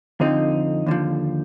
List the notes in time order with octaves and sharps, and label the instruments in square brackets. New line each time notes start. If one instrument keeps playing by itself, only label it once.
[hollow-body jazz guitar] F2 D3 F3 C4 D#4
D#2 D3 F3